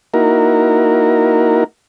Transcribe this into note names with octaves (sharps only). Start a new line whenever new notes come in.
A#3 D#4 E4 F#4 A#4